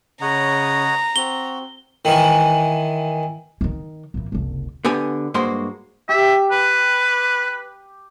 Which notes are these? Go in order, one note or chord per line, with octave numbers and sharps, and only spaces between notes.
C#3 C#5 D#5 F#5 A#5
C4 F#4 G7
D#3 E3
D#3 E3
A#2 E3
F#1 C2
D3 B3 G4 G#5
G2 G#3 A#3 F#4 C5 C6
G4 E5
B4